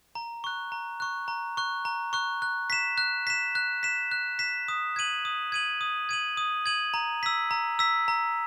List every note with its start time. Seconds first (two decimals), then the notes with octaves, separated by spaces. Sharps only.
0.15 A#5
0.44 C#6 F#6
0.72 A#5
1.00 C#6 F#6
1.28 A#5
1.57 C#6 F#6
1.85 A#5
2.13 C#6 F#6
2.42 F#6
2.70 B6 E7
2.98 F#6
3.27 B6 E7
3.55 F#6
3.83 B6 E7
4.12 F#6
4.39 B6 E7
4.68 D#6
4.96 G#6 D#7 F#7
5.25 D#6
5.52 G#6 D#7 F#7
5.81 D#6
6.09 G#6 D#7 F#7
6.37 D#6
6.66 G#6 D#7 F#7
6.94 A#5
7.23 E6 B6
7.51 A#5
7.79 E6 B6
8.08 A#5